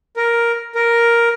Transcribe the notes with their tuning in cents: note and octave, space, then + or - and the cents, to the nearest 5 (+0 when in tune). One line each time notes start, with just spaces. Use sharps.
A#4 +5
A#4 +5